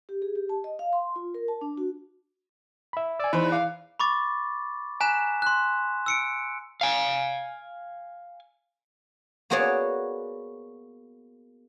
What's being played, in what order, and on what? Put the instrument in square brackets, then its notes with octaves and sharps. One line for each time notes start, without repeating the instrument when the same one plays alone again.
[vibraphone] G4
G#4
G4
A5
D#5
F5
C6
F4
A#4
A5
D4
F#4
[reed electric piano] E5 B5
[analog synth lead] D5 [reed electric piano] G#5 E6
[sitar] E2 [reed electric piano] D#4 C5 [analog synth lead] B5
[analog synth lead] F5 [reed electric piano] D6
[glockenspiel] B5 C#6 D6 A6
G#5 A#5 F#6 B6 E7
C6 F#6
E6 C#7 D7
[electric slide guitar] F5 G#5
[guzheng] A#3 B3 F#4 G#4 C#5 D5